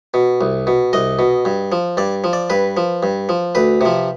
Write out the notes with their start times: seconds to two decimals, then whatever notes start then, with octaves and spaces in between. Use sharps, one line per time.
0.14 B2
0.41 C2
0.67 B2
0.93 C2 D#5
1.19 B2
1.45 G2
1.72 F3
1.97 G2 D5
2.24 F3
2.33 D5
2.50 G2 B4
2.77 F3
3.03 G2
3.29 F3
3.55 D2 B4
3.81 C3 F3